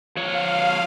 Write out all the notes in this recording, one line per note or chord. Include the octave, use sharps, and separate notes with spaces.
F3 C#5 F5